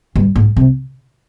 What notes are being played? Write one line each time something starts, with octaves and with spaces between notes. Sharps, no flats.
G2
G#2
C3